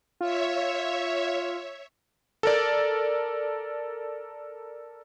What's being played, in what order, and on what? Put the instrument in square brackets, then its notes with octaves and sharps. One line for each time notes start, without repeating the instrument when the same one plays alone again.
[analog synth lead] F4 [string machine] C#5 E5
[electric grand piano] A4 A#4 D5